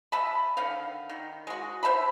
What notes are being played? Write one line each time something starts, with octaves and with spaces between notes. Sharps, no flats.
E5 A5 B5
D3 D#3 F5
D#3
G#3 F#4
C5 E5 A5 B5